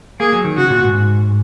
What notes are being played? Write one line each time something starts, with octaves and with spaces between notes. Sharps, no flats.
A#3 G#4
F#3
D#3
C#3 F#4
A#2
G#2